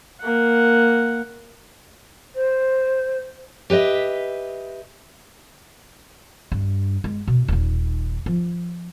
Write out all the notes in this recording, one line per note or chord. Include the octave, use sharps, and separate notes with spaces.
A#3 F#5
C5
G4 B4 C5 D#5 E5
G2
G#3
B2
D#1 D#4
F3